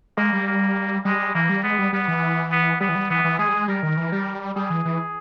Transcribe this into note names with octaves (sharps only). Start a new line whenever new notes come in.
G#3 A#3
G3
A#3
G3 G#3
E3 A#3
G3
G#3 B3
G3
G3 B3
E3
B3
G3 B3
E3
G3
E3 B3
E3
G#3 G#4
G3
G#3
G3 A#4
D#3
E3
G3
G3 G#4
E3
E3